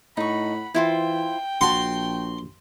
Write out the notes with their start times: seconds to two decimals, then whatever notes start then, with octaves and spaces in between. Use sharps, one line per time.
0.17 A2 D#4 F#5 B5 C#6
0.74 E3 E4 F4 C5 G5
1.61 A#1 F#4 A5 C6